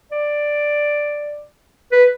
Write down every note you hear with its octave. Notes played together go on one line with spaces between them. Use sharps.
D5
B4